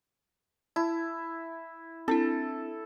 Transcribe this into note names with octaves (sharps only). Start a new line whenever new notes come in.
E4 A5
C4 D4 E4 A4